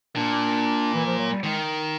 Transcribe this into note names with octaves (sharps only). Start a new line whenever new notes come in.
A#2 D4
E3
F3
F#3
G3
D#3 G#3